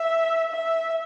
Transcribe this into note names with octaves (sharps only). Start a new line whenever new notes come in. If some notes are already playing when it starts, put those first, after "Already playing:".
Already playing: E5
E5